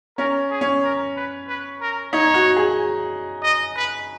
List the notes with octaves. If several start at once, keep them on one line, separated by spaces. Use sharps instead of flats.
C#4 A#4
G#4
C#4
A#4
B4
B4
A#4
D#4 C#5
F#4
G#4
D#5
B4